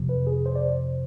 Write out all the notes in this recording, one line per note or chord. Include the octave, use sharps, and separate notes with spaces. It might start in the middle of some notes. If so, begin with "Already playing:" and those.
Already playing: F2 C3 F3
B4
G#4
C5
D5
C5